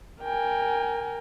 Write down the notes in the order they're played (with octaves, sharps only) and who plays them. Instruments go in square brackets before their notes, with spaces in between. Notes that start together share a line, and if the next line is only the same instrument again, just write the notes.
[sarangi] A#4 [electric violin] G5 G#5